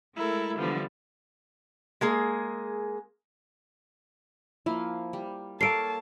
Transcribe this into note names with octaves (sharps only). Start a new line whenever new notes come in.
G#3 A3 E4 A4 A#4
D3 E3 F3 G3 B3
G#3 A#3 G#4
F3 A#3 E4 F5
G3
A#3 A4 A#4 C#5 A5 C7 D7